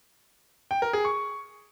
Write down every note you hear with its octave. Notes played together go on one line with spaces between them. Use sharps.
G5
A#4
G#4
C#6